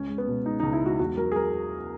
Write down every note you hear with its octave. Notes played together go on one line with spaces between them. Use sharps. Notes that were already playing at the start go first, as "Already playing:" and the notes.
Already playing: C#2 C#3 C#4
G#3
B3
B2
G#3 D#4
C#2 D#4
E4
G#3 F#4
E2 F#4
F#3 A#4
G#4
F#3 A#4